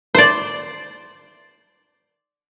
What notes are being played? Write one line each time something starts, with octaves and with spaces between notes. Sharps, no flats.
C5 D5